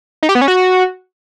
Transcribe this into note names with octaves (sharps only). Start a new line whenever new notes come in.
D#4
G4
B3
C#4
F#4